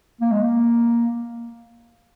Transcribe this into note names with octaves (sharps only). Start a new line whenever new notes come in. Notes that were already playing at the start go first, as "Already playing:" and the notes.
A#3
G#3
A#3